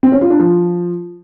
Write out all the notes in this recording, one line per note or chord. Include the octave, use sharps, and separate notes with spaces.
C4
C#4
F4
D4
F3